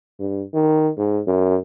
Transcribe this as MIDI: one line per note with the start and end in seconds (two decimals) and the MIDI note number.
0.19 0.43 43
0.54 0.89 51
0.98 1.20 44
1.27 1.57 42